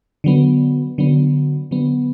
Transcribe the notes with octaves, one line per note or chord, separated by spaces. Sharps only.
D3 F#3 B3
D3 F#3 B3
D3 F#3 B3